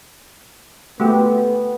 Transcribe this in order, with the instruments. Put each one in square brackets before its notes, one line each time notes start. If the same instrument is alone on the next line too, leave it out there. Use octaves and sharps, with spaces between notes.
[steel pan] A3 F#4 G4 [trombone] B3